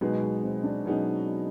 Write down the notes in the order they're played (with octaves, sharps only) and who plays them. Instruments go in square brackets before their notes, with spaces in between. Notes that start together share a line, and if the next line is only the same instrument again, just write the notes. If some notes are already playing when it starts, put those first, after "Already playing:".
[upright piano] B2 F#3 B3 D#4 G#4 [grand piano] G#3
[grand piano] G#3
C4
D4
[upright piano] B2 F#3 B3 D#4 G#4 [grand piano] C#4